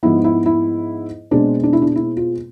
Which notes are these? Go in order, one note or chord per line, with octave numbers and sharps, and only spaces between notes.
G#2 F3 B3 E4
E4
E4
B2 G#3 C4 D4
D4
E4
D4
E4
F4